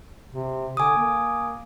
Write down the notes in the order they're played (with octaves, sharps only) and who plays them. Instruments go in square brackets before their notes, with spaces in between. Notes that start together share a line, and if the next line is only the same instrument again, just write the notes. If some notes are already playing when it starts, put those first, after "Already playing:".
[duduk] C3
[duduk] D3 [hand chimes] G#5 D6 D#6
[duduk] A#3